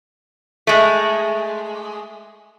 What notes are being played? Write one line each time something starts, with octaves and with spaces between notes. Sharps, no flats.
G#3 A3